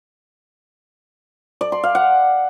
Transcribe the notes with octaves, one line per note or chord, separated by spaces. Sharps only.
D5
C6
F5
F#5